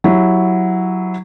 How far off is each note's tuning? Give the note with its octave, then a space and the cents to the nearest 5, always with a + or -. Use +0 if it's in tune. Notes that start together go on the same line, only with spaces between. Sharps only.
F#3 +0 E4 +0 G4 +0